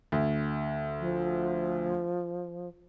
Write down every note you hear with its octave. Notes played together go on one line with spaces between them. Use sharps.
D2
F3